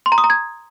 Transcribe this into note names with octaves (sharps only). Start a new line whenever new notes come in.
C6
A#5
D#6
A#5
G#6